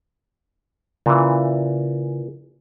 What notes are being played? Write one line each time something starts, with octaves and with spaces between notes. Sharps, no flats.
A#2 C#3 E3